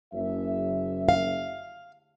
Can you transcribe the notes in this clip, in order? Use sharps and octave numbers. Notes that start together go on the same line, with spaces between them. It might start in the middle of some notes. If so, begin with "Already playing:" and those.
F#1 F#2 E5
F5